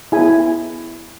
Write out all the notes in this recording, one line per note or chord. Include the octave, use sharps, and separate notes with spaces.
B3 E4 G#4 G#5